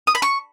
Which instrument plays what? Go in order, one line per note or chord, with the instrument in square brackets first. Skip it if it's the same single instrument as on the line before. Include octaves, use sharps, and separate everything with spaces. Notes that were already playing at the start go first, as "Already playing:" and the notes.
[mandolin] D#6
B5
C#6